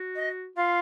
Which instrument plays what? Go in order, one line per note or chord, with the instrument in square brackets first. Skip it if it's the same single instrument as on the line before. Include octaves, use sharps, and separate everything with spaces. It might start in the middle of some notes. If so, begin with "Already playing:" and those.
Already playing: [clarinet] F#4
[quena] D#5
[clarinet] F4 [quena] F5